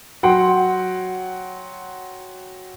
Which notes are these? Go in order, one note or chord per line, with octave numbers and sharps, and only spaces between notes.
F#3 F#5 G5 C6